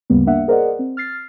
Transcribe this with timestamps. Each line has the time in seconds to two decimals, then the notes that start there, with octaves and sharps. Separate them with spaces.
0.10 D2 G2 C#3 G3 A#3 B3
0.27 A#3 D4 E5 F#5
0.48 G#4 A#4 C5 D5 D#5 F#5
0.79 C4
0.97 F6 A6 C7